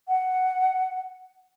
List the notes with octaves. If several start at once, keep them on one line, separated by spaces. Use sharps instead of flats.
F#5